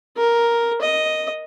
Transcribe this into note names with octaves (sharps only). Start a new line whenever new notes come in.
A#4
D#5